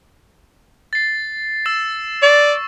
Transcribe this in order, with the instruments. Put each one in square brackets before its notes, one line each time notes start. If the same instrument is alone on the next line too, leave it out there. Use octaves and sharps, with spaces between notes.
[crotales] A6 C7
E6 A6 E7
[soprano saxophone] D5 [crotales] C#6